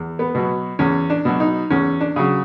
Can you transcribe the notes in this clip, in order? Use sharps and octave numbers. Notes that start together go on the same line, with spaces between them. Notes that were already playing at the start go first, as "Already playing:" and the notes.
Already playing: E2
B3
B2 F#3
E2 C#4
D4
B2 F#3
D#4
E2 C#4
D4
C#3 F#3